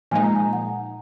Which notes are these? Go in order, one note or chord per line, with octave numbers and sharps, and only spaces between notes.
A#2 F3 G#3 D#4 G#5
A#5
G#5
F#5